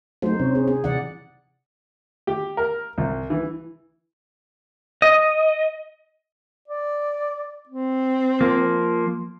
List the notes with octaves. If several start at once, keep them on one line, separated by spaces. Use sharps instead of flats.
F#3 A3 D#4 C5
C3 C4 C#4
G#4
G#4
C3 E3 D5 F#5
G4
A#4
C2
E3
D#5
D5
C4
F3 A#3